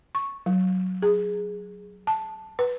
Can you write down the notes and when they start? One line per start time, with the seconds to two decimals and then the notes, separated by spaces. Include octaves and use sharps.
0.15 C#6
0.46 F#3
1.02 G#4
2.07 A5
2.59 B4